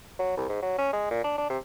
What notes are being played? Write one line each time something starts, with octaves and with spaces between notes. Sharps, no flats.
F#3
C2
G#2
F#3
C#4
G#3
A#2
D4
D4
C3